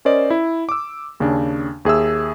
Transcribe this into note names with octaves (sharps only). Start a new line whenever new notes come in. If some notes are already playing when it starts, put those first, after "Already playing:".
C#4 A#4 C5 D5 D#5
E4
D6 E6
D#2 C#3 C#4 D4
D#2 G#4 E5 E6